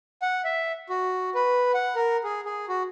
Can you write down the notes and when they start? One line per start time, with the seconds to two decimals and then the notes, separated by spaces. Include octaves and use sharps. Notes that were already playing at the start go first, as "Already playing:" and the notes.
0.22 F#5
0.45 E5
0.90 F#4
1.35 B4
1.74 F#5
1.96 A#4
2.24 G#4
2.45 G#4
2.69 F#4